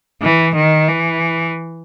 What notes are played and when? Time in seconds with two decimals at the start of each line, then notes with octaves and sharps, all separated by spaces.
0.22 E3
0.56 D#3
0.89 E3